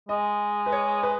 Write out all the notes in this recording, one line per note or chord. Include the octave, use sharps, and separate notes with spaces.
G#3 D#5
B4
C#5
B4